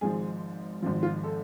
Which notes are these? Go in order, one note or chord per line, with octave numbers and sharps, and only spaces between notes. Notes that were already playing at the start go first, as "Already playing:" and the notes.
G#1 G#2 F3 G#4
G#1 G#2 F3
F4
A4